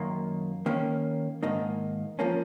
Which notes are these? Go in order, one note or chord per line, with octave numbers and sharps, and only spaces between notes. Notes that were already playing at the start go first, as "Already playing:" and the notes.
Already playing: F#2 D#3 A#3
D#3 A#3 C#4
G#2 D#3 A#3 D#4
F3 A#3 C#4